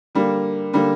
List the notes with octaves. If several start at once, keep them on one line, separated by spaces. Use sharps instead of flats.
D3 G3 A#3
D3 G3 A#3